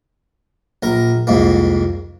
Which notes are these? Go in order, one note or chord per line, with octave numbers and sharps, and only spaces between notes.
A#1 A#4 A#5
C2 F2 G#2 A#3